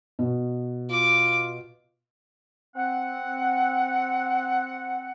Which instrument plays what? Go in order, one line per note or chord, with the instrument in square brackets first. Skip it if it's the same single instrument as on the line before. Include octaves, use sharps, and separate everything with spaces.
[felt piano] B2
[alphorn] F4 [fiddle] D6
[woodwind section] C4 F#5